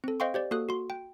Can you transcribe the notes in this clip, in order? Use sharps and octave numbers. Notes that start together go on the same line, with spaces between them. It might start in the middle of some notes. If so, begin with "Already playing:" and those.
C4 A4
C5 D#5 F5 G5 C6 C#6
G4 C5 D5
A#3 F#4 A4 D#6 F#6
F#4 C6
G5